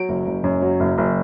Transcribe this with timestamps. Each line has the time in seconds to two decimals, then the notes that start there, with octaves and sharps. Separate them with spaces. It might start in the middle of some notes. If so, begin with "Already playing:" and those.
Already playing: F#3 D7
0.09 F#1
0.26 F#1
0.44 F#2
0.62 F#3
0.80 F#1
0.98 F#1